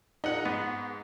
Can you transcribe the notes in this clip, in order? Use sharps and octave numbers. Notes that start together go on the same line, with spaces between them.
A#1 D#4 F#5
G#2 B3